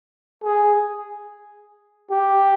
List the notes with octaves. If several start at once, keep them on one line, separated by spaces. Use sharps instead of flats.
G#4
G4